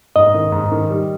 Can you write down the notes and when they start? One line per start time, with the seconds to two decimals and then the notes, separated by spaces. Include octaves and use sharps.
0.16 G#2 D#5
0.34 D#3
0.52 G#2
0.72 D#3
0.90 G3